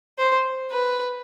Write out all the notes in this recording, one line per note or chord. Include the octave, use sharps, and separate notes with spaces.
C5
B4